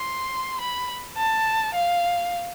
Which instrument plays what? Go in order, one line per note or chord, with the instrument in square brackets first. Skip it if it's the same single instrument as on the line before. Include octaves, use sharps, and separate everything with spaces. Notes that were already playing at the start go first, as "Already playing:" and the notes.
Already playing: [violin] C6
B5
A5
F5